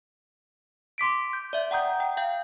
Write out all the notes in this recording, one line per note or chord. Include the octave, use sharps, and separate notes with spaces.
C6 D6 B6 D7
G6
D5 E5
F#5 G5 A#5 D#6 G6
G5
F5 G5 G6